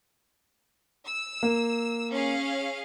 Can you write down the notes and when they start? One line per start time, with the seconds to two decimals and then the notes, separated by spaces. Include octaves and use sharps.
1.06 E6
1.43 A#3
2.11 C#4 G#4 F5